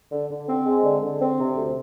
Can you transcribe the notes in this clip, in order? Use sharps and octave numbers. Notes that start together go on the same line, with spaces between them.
D3
D3
C4
G#3
D3
D3
C4
C3
D2